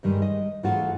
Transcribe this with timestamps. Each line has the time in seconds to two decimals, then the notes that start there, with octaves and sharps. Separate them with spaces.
0.03 G2 D#3 G3 G#3
0.22 D#5
0.63 G#2 E3 G#3 A3 F4 F#4